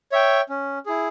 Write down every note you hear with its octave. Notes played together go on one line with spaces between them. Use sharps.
C#5 E5 G5
C#4
E4 G#4